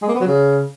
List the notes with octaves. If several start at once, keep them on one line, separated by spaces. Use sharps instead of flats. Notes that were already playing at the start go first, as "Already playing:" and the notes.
G#3
A#3
B3
F#3
C#3